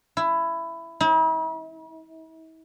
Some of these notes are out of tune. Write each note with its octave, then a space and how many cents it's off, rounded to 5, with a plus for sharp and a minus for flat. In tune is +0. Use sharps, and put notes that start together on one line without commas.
E4 +15
E4 -45